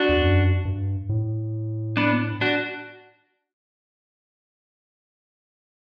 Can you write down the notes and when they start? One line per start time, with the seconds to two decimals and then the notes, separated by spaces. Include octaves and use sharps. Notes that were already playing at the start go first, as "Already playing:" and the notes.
Already playing: D4 F#4
0.09 E2
0.21 F#2
0.65 G2
1.09 A2
1.97 B3 D4
2.41 D4 F#4